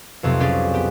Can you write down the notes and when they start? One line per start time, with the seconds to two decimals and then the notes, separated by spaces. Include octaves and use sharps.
0.23 B1 F2 C3
0.40 C#4 G4 G#4 D5
0.74 B3 G4